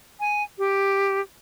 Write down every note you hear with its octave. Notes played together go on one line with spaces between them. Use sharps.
G#5
G4